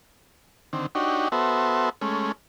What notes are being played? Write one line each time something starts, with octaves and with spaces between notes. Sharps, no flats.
D3 D#3 C4
D4 D#4 F#4 G4 C#5
B3 F#4 A4 C5 E5
G#3 A3 C#4